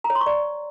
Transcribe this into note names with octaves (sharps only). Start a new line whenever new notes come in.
A#5
C#5
C6
C#6
D5